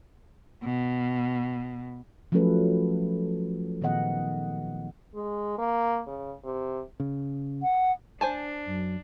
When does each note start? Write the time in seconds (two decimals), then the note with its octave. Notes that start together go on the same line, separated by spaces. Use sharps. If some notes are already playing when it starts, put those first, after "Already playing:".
0.64 B2
2.32 F3 F#3 A3 C#4 A4 B4
3.81 A#2 D#3 B3 D#5 F#5
5.14 G#3
5.58 A#3
6.07 C#3
6.44 C3
7.00 C#3
7.62 F#5
8.21 D4 C5 G#5 A5
8.66 F#2